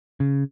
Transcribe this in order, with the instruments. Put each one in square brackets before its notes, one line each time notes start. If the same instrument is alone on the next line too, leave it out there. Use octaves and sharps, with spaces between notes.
[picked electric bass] C#3